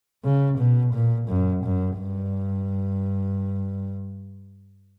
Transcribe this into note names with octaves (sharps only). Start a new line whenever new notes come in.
C#3
B2
A#2
F#2
F#2
G2